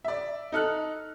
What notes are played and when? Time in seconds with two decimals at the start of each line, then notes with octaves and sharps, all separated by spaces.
0.04 D5 E5
0.52 D#4 A4 F6 F#6